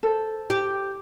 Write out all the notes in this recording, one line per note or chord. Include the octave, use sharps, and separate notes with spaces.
A4 C5
G4